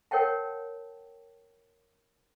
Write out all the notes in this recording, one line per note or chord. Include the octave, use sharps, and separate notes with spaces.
A#4 C#5 F#5 G5 A5